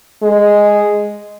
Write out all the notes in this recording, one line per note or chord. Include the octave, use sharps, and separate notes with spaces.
G#3